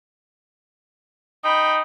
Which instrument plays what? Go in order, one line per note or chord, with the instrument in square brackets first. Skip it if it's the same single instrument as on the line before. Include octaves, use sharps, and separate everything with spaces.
[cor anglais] D#4 [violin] G5 B5